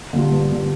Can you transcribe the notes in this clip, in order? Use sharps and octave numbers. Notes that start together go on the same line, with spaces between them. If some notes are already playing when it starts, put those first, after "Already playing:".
D3 G3 F4
G2
D3 G3 F4